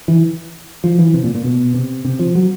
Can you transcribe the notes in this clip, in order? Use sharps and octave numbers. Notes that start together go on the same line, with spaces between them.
E3
F3
E3
C3
A#2
A#2
B2
C3
C3
F3
F#3